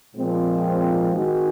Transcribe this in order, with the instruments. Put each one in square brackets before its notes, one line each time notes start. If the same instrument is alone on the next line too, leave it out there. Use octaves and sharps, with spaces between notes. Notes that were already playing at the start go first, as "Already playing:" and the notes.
[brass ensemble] A#2 F3 G#3 C4
D#3 G#3 C4 D#4 F#4